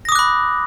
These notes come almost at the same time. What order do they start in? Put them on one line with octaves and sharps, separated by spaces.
A#6 D#6 D6 F#6 B5